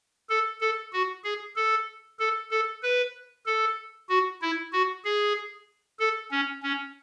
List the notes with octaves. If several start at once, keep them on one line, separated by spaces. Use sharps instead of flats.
A4
A4
F#4
G#4
A4
A4
A4
B4
A4
F#4
E4
F#4
G#4
A4
C#4
C#4